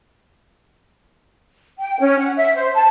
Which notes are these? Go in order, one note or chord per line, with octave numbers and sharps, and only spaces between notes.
G5
C#4
F#5
E5
C5
A5